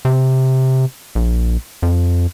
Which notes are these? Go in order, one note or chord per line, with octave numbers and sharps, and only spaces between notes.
C3
A#1
F2